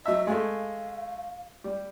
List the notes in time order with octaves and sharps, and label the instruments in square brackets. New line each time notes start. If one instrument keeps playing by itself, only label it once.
[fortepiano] F#3 E5 [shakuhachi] D#5
[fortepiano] G#3 A3 [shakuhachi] F5
[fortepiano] G3